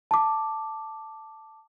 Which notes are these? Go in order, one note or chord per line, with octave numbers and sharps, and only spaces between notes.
A5 D6